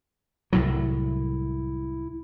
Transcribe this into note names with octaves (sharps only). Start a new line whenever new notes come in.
C2 A2 F#3 E4